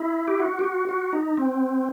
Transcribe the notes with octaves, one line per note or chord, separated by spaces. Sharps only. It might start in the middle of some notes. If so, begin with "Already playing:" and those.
Already playing: E4
G4
F#4
G4
F#4
F#4
D#4
C4